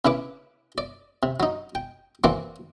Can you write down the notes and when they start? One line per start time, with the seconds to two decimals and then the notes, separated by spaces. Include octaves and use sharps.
0.05 C#3 E4 B4 D6
0.78 D5
1.23 C3
1.40 F#3 D#4
1.75 G5
2.24 E3 A#3 C4 F#4 D5